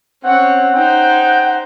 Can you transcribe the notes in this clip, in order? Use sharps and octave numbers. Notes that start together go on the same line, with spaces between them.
C4 C#4 C#5 F#5
D#4 C5 G5